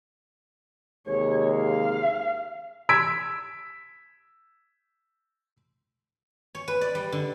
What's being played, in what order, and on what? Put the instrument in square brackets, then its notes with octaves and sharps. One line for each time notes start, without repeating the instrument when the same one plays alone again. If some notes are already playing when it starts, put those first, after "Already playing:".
[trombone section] D#2 C3 G#3 [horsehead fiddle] C#5
[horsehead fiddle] F5
[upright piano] E6 G#6 B6 D7
[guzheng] C#5
B4
D5
G3
D3